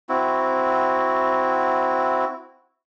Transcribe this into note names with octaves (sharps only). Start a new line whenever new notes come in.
C4 E4 F#4